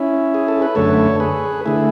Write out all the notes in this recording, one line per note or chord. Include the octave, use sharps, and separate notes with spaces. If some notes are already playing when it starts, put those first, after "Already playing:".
Already playing: C#4 E4
G#4
A4
B4
F#2 D3 A3 A4 C#5
G#4 B4
D3 A3 E4 G#4